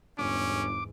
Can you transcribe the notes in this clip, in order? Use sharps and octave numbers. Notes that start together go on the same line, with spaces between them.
G1 E2 G#2 C#4 D6